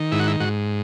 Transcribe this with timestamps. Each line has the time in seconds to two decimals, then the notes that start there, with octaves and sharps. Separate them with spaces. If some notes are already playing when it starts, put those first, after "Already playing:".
Already playing: D#3
0.12 G#2 E4
0.19 F#4
0.27 E4
0.40 G#2 F#4